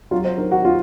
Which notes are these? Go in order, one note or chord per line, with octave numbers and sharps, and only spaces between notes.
F#3 F4
C5
D#3 A#4
F#4
F4